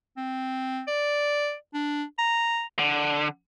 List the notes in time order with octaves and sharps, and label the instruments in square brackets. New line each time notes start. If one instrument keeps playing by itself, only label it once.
[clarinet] C4
D5
D4
A#5
[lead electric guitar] D3